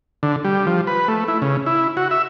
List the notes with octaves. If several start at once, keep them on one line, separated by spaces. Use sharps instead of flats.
D3
G3
F3
B4
A3
E4
C#3
E4
F#4
E5